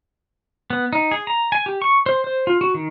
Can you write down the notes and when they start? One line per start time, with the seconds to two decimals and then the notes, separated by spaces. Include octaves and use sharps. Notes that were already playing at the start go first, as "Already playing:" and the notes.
0.70 B3
0.93 D#4
1.11 G#4
1.27 A#5
1.52 G#5
1.66 G4
1.82 C#6
2.06 C5
2.24 C5
2.47 F4
2.61 F#4
2.74 D#3